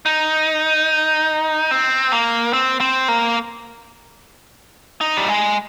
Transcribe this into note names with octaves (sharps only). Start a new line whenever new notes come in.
D#4
C4
A#3
C4
C4
A#3
D#4
G3
G#3